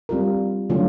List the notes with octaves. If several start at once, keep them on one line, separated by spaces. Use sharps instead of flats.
G3 C4 F4 A#4
D3 F#3 A3 C#4 F4